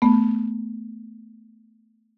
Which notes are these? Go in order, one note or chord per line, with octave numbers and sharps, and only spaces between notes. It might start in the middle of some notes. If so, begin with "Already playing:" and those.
A3 B3